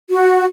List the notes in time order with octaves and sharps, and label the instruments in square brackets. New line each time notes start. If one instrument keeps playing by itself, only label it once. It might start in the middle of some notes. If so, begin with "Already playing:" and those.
[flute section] F#4